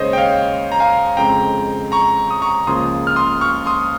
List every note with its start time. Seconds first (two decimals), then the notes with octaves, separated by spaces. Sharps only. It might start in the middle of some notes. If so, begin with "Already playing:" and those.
Already playing: D#2 C#3 G#3 C5 C#5 D#5
0.13 G5
0.18 C#5 F5
0.72 A#5
0.80 F5 G#5
1.17 F2 C#3 G#3 C4 G5 A#5
1.92 A#5 C#6
2.31 D#6
2.42 A#5 C#6
2.67 C#2 C#3 F3 A#3 C6 D#6
3.07 F6
3.16 C6 D#6
3.41 C#6 F6
3.66 C6 D#6